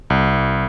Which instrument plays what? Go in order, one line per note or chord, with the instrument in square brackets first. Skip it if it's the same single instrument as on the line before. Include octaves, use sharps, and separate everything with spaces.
[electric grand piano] C2